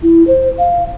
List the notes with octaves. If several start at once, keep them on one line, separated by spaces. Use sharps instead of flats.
E4
C5
F5